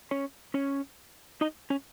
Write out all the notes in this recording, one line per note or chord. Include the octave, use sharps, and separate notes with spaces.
C#4 C#5
C#4 C#5
D#4 D#5
C#4 C#5